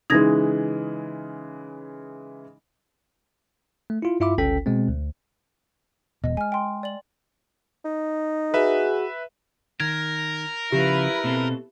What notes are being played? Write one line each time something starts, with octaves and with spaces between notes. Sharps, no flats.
C#3 E3 G#3 D#4 G#6 A#6
A3
E4 F4
G2 E4 F4 E5 B5 D6
G1 C#2 C#4 A4 G5 B6
B2 G#3 C4
D2
E1 B2 D#5
G#3 G#5 F6
G5 C6
D5 F#7
D#4
F#4 G#4 B4 E5
D#3 A#4 G#6
C#3 F3 E4 G4 B4
B2 C4 A4